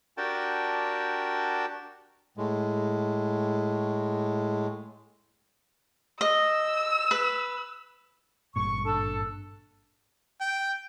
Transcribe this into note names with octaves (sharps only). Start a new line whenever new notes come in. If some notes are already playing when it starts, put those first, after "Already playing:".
D4 F#4 G4 A#4 G5 A5
A2 G#3
D#5 E6
B4
G#1 G2 A#2 C#6
D4 A4
G5